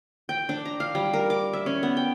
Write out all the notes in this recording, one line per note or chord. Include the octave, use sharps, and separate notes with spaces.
G5
D4
A#5
F5
G3
A#4
D6
E5
C#4
B3
G5